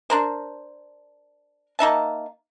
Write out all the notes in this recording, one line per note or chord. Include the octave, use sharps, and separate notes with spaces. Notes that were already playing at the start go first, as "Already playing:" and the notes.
D4 A#4 C5
A#3 D#4 E5 A5